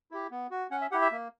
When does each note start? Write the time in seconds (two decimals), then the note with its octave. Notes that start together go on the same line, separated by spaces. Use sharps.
0.11 E4 G4
0.31 B3
0.51 F#4
0.71 C#4 F#5
0.81 E5
0.91 E4 G4 F#5
1.02 E5
1.12 A#3